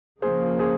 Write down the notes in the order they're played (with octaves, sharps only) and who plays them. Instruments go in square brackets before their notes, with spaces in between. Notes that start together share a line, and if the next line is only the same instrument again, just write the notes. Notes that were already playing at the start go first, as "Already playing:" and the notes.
[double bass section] C#3 F3 A#3 [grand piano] G#4 C5
[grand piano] G#4 C5